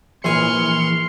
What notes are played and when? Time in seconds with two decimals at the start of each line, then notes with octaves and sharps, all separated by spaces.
0.24 A#1 A#2 E3 G#5 C6 F6 C#7